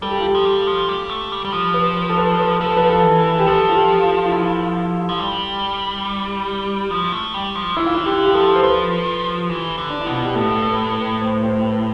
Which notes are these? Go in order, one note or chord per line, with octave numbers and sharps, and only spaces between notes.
G3 A4
G4
F4
G4
F3
G3
F3
G3
A3
G3
G3
F3
B4
B4
A4
B4
B4
F3 A4
B4
A4
E3
A4
G4
F3 A4
F4
G4
F4
F4
E4
F3
G3
F3
A3
G3
F3
E3 E4
F4
E4
D3 G4
G4
F3 A4
C5
F3 B4
E3
D3
D4
E4
B2
F4
G4
A2 A4
B4
B4
C5
C5
B4